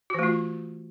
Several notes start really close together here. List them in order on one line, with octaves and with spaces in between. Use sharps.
F#4 E3 A3 F4